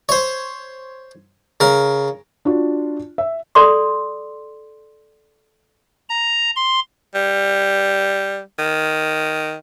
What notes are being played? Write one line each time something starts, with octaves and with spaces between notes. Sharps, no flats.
C5 C#5
C#3 A#4
D4 F4 F#4
E5
A4 D5 C6 D6
A#5
C6
G3
D#3